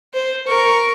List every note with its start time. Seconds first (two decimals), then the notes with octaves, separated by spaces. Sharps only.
0.14 C5
0.47 A#4 C#6